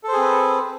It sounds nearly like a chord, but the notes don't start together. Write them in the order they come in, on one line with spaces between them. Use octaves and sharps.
A4 C5 G#4 C4 B4